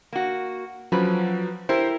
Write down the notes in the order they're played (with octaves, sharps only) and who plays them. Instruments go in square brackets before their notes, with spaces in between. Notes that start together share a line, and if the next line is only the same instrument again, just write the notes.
[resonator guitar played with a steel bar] A#3 F#4
[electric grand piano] F3 F#3 [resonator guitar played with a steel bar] C#4 B4
[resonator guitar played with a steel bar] E4 G4 A#4 [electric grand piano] C5